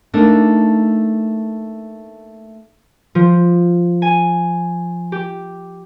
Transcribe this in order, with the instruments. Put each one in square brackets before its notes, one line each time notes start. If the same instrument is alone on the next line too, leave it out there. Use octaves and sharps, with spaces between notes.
[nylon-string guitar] A3 A#3 D4 D#4
[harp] F3
G#5
G4